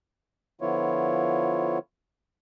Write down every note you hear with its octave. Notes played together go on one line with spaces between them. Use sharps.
D3 F3 B3 E4 F4 C#5